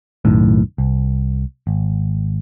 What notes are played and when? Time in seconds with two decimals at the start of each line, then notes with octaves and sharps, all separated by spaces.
0.25 B1 F#2 A2 D#3
0.78 C2
1.67 G#1